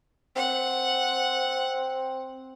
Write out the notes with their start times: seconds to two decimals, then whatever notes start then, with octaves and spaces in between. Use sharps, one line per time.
0.36 C4 F#5